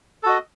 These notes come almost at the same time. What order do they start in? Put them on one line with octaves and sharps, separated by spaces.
A4 F#4 D#5